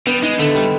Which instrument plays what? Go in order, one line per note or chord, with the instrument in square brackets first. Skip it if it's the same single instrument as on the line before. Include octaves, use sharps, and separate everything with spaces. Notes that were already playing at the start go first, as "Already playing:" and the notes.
[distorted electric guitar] G3 [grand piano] B3
[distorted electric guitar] G#3 [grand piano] D#4
[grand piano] D3 [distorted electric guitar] A3
[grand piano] G3